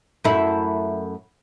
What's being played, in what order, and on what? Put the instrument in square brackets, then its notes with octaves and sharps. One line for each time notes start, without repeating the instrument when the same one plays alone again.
[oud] F#2 A3 E4